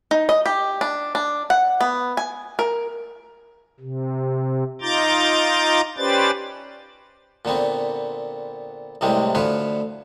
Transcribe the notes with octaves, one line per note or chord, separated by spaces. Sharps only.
D#4
D#5
G4
D4
D4
F#5
B3
G#5
A#4
C3
D#4 F4 A#5 D6 G6 A6
C#4 G4 B4 C5 D5 A6
A#2 D3 B3 C4
C2 A2 C3 G3 G#3 C4
D2 D3 F3 B4 C#5 C6